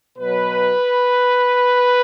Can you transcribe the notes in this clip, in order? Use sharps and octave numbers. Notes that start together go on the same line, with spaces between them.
B2 F#3 B4